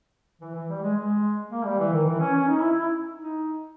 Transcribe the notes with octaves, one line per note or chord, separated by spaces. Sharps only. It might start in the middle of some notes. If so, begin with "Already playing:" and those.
E3
E3
G3
G#3
G#3
A#3
G3
E3
D#3
E3
C#4
C#4
D#4
E4
E4
D#4